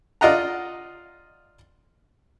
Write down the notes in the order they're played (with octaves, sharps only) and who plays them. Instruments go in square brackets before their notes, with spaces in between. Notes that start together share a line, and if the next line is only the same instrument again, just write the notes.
[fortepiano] F4 D5 D#5 F#5 A#5